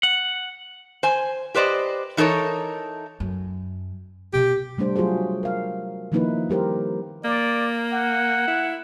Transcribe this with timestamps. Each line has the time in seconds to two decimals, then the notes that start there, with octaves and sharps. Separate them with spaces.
0.03 F#5
1.03 C5 G#5
1.54 G4 B4 C5 D5 D#5
2.17 E3 D#4 A4 A#4 C#5
3.20 F#2
4.33 B2 E3 G4
4.77 C3 G3 A3 D4 C5
4.96 F#3 F4 F#4 G#4 C5
5.43 A#4 F5
6.12 D#3 F3 A#3 D#4 E4 B4
6.50 G3 G4 A#4 C5
7.24 A#3 D5
7.92 F#5
8.47 E4